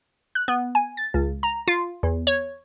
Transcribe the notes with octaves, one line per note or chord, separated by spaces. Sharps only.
F#6
B3
G#5
A6
C#2
A#5
F4
E2
C#5